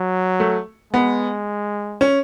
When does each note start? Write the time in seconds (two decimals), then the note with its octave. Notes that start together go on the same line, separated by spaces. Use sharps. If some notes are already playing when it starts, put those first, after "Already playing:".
Already playing: F#3
0.40 A3
0.93 G#3 B3
2.01 C#4